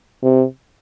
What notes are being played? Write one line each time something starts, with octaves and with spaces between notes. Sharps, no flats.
C3